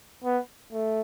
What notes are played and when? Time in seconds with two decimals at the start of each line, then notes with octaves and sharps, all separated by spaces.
0.24 B3
0.72 A3